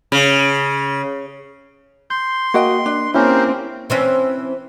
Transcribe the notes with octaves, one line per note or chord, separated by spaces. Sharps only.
C#3
C6 G6
A#3 F#4 D#5 G5
D4
A#3 C4 C#4 E4 G4 A#4 C5
E3 C4 C#4